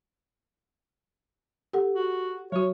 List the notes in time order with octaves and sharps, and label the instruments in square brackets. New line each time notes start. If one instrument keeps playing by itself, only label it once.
[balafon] G4 A4 F#5
[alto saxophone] F#4
[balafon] F#3 F#4 [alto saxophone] C#5